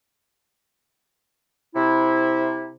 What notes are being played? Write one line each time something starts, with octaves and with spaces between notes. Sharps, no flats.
C3 E4